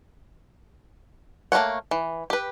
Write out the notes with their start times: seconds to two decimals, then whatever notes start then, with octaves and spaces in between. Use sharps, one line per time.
1.52 A3 A#3 C#4 C#5 F#5
1.91 E3
2.30 G4 B4